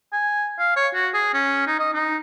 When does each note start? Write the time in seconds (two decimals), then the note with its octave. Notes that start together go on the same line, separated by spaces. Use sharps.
0.13 G#5
0.59 F5
0.76 C#5
0.94 F#4
1.14 G#4
1.34 C#4
1.67 D#4
1.80 D#5
1.93 D#4